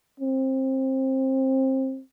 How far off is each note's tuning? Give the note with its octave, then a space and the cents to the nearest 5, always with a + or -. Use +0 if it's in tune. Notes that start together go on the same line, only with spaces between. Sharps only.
C4 +20